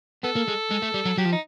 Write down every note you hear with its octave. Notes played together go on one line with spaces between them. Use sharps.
B3 A4
A#3
G#3
G#3
A3
G3
F#3
F#3 G4
F3
D#4